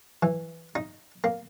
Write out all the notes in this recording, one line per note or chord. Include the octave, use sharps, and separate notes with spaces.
E3
D#4
A#3